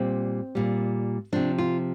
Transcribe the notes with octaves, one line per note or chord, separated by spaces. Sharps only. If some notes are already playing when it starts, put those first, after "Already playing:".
Already playing: A#2 G3 C4
A#2 G3
C3 F3 D4
F4